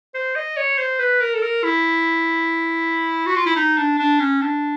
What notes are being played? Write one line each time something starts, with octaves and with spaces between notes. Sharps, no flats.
C5
D#5
C#5
C5
B4
A#4
A4
A#4
E4
F#4
F4
E4
D#4
D4
D4
C#4
D4